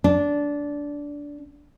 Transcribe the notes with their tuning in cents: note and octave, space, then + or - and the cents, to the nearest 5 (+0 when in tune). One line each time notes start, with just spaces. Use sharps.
D4 -15